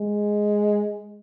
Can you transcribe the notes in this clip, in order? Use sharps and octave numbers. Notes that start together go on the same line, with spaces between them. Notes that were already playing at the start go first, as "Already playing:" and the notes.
Already playing: G#3